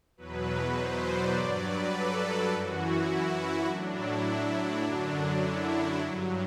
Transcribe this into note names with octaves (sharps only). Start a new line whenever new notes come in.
E2 B2 F#3 B4
C5
D5
G2 F#3
B4
A4
F#2 E3 F#4
E4
E4
A2 F#3 D4
E4
D4
F#2 D3 F#3 D4
E4
G2 F#3